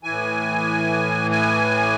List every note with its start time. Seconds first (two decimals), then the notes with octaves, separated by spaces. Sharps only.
0.03 A2 E3 G#5
1.31 G#5